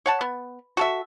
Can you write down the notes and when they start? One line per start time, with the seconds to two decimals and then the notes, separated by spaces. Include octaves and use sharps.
0.06 C#5 F#5 A5
0.21 B3
0.77 F#4 A4 E5